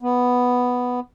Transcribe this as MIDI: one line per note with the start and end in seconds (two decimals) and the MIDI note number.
0.02 1.00 59